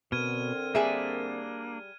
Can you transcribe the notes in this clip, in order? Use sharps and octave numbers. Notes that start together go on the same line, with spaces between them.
B2 D3 C4 A#4 F6 G#6 D#7
G3 A#3 D4 G#4 E5